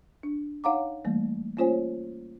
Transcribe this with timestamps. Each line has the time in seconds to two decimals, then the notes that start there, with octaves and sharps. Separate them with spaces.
0.23 D4
0.64 D#4 C#5 F5 F#5 A#5 D6
1.05 E3 G3 A3 A#3
1.57 A#3 C#4 F4 C5 C#5 G#5